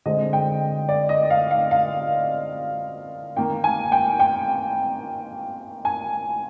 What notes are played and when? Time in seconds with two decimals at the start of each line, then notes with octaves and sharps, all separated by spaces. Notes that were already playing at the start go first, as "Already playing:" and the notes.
0.06 D3 G#3 C4 D#5
0.33 G5
0.89 D5
1.09 D#5
1.30 F5
1.51 F5
1.71 F5
3.37 D#3 A#3 G5
3.64 G#5
3.92 G5
4.20 G5
5.85 G#5